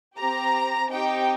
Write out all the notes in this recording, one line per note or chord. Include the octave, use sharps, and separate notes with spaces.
C4 G4 A#5
C4 D#4 G4 G5